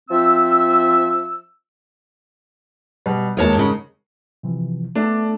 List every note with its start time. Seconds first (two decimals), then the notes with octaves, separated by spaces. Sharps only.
0.10 F3 C4 E5 E6
3.06 B2 G3
3.37 D#2 G#3 A#4 C#5 A5
3.55 G#2 C#3
4.43 C3 E3 F3
4.95 A3 B3 D4 D5 E5